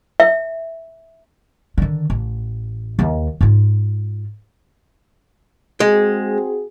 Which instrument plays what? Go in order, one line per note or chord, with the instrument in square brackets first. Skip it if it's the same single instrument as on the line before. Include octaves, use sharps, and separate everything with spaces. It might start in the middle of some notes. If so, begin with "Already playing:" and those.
[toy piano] E5
[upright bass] D3 D#3
A1
D#2 D#3
G#2 F4
[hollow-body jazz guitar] G#3 [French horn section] C4 F#4 G#4